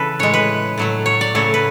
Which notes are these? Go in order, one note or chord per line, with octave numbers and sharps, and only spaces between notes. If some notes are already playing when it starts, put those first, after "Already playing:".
Already playing: C#3 E3 A4 B4
A2 G#3 C#5
B4
A2 F#3 A3
C#5
D5
C#3 F#3 A3 C#5
B4